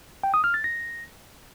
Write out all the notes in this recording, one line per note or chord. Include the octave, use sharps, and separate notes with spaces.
G5
D#6
F6
A6
A#6